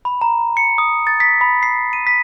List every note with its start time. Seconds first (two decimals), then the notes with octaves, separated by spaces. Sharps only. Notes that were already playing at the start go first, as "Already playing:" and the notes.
0.05 B5
0.21 A#5
0.57 C#7
0.78 D#6
1.07 A6
1.20 B6
1.41 B5
1.63 C7
1.93 D#7
2.07 B6